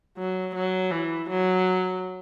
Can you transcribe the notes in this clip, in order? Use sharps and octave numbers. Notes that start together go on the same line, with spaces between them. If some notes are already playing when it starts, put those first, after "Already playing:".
F#3
F#3
E3
F#3